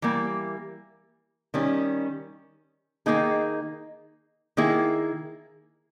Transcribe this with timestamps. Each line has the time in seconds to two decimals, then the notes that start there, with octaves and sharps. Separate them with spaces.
0.02 E3 G3 A#3
1.54 D#3 G3 C#4
3.06 D#3 A#3 D#4 G#4
4.57 D#3 A#3 E4 G#4